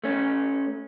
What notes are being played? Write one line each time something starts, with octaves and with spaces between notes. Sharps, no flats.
A3 C#4